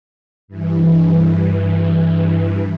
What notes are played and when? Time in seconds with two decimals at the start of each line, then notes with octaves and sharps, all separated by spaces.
0.48 G2 E3